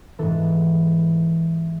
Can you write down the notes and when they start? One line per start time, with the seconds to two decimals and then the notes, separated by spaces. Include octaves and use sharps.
0.19 G#2 E3 A4